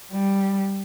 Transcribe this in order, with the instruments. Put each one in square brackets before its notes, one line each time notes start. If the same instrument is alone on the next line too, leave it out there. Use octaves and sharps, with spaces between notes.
[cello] G3